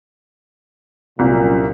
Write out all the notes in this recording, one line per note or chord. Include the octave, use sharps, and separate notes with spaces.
C2 F#2 A#2